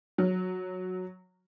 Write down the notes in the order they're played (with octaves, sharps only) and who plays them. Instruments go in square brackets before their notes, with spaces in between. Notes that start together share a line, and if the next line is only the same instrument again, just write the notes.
[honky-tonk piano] F#3